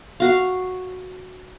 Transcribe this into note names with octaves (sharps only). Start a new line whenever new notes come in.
F#4 F5